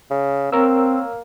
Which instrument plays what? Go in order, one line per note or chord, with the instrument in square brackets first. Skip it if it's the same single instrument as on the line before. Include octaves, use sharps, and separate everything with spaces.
[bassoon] C#3
[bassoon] A#3 [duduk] C4 [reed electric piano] A#4 C#5 E6